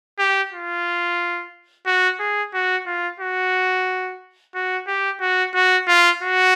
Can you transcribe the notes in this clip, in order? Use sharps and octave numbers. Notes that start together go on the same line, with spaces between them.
G4
F4
F#4
G#4
F#4
F4
F#4
F#4
G4
F#4
F#4
F4
F#4